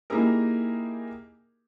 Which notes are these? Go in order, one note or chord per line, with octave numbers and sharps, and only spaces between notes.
A#3 D#4 E4 G4 G#4 A#4